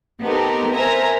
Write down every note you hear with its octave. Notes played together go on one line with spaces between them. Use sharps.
B3 C4 D#4 G4 A4 A#4
A#4 C5 E5 G#5 A#5